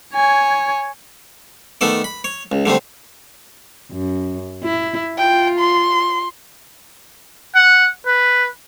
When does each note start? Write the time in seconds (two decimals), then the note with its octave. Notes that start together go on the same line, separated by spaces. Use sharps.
0.15 C#5 G#5
1.81 D#3 A3 B3 A4 D5
2.04 B5
2.24 C#5
2.52 C#2
2.66 D3 G3 A3 C4
3.91 F#2
4.64 E4
5.18 F4 G5
5.59 C6
7.55 F#5
8.06 B4